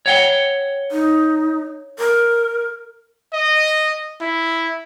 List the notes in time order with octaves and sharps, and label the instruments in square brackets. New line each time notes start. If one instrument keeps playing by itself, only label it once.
[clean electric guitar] C#5 F#5 G5
[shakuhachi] D#4
A#4
[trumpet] D#5
E4